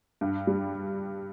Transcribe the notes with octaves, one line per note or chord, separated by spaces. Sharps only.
G2
G3